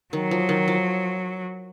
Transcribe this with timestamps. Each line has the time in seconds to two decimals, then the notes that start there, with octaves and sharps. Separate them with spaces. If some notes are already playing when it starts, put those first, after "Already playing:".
0.13 D#3 F#3
0.31 F3
0.49 D#3
0.68 F3